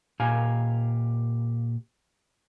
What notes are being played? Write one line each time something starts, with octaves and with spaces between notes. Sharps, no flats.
A#2 G4 F5 G#5